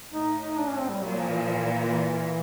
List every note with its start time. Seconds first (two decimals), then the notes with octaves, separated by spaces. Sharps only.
0.13 A2 D#4
0.42 D#4
0.57 D4
0.68 C#4
0.79 C4
0.90 G3
1.01 A#2 F#3
1.16 F3
1.30 E3
1.43 F3
1.54 E3
1.88 E3